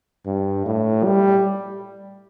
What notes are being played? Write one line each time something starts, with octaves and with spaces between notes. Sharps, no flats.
G2
A2
G3